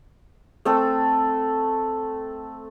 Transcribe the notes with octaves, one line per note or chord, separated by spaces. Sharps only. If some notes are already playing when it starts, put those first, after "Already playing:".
A3 C4 A4